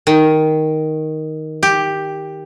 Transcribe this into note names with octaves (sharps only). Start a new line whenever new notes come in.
D#3
G4